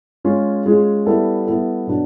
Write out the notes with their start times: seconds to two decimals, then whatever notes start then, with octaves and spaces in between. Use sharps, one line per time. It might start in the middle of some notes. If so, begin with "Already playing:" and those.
0.24 G#3 C#4 F4 G#4
0.66 G#3 C#4 F4 G#4
1.06 G3 B3 E4 A4
1.47 G3 B3 E4 A4
1.87 B2 F#3 B3 D4